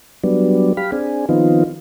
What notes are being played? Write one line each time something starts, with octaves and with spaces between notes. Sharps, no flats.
F#3 G3 B3 D4
G4 F5 B5
C4 D4 G#4
D#3 F3 B3 C4 D#4 F4